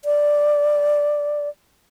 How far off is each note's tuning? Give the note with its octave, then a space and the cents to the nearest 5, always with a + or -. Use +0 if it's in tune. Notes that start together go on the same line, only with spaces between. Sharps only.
D5 +0